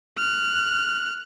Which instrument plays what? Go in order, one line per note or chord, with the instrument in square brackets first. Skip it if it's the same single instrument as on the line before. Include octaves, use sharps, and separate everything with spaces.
[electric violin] F6 F#6